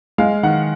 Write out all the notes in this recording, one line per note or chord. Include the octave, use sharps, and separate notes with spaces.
G#3 F5
D#3 F#5